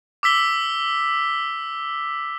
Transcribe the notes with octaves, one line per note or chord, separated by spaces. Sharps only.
D6 E6 B6 G7